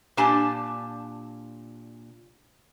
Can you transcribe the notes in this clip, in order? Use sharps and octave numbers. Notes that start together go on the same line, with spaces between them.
A#2 D4 G4 G#5 A5